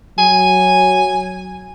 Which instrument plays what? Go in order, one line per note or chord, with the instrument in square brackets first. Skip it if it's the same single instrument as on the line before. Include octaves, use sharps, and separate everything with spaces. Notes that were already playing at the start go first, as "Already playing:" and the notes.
[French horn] F#3 [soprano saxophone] G#5